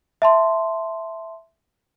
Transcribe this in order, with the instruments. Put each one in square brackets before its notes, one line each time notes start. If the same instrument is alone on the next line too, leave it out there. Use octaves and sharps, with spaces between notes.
[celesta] E5 A5 C6